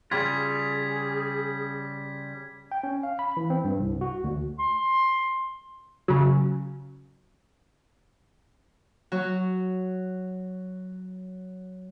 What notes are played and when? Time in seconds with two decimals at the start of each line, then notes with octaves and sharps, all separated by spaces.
0.11 C#3 G3 F4 G#4 G#6 B6
2.72 G5
2.83 C#4
3.03 F5
3.19 B5
3.37 E3
3.50 C4
3.64 G2
3.79 C2
4.01 F#4
4.24 D2
4.59 C6
6.08 C#3 F#3
9.12 F#3 F#4